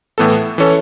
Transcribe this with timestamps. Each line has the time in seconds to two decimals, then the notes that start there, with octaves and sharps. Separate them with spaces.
0.18 A2 E3 B3 A4
0.58 E3 C#4 A4 C#5